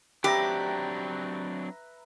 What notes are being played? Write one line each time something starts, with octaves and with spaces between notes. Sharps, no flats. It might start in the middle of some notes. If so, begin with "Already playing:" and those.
F#3 C4 D4 G4 B4 E5 A#5